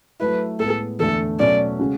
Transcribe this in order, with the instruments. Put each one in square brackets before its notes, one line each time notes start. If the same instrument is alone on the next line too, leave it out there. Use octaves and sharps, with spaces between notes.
[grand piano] F#3 A3 E4 [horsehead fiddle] B4
[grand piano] A2 G#3 B3 [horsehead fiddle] A4
[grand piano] E2 D3 A3 [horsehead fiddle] A4
[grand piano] B2 F#3 A3 C#4 F#4 [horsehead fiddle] D5
[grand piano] C#3 G#3 C#4 F#4